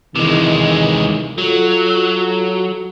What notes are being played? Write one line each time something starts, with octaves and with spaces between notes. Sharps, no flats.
C3 D#3 E3 G#3
F#3 F4 A4